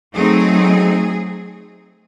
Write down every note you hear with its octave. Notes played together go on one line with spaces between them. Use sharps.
F#3 A3 C4 D#4 G#4